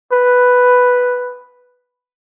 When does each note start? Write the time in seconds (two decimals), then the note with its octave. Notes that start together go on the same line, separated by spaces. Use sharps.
0.13 B4